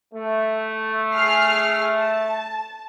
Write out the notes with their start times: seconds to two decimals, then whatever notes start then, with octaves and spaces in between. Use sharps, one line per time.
0.14 A3
1.15 G#4 F6 C7
1.94 A5